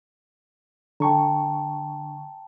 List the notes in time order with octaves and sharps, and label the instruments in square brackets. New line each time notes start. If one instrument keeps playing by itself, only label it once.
[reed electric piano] D3 C#6 [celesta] G5 A5 A#5